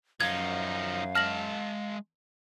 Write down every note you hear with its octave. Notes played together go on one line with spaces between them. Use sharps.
F#2 F3 D#4 F5 G#6
G#3 A5 F6 A#6 F#7